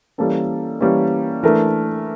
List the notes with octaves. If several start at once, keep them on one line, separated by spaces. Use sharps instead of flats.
E3 G3 A#3 C#4 A4
E3 G3 A#3 C#4
E3 A3 D4 A#4